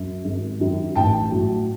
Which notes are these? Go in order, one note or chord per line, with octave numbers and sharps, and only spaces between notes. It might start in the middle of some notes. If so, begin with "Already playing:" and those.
Already playing: F#2
G#1
F#2 D#3
A1 G5 A5
A2 F#3